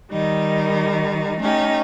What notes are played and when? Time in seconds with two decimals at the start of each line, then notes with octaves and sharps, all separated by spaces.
0.11 D#3 G3 D#4
1.40 A3 C#4 D#4 G4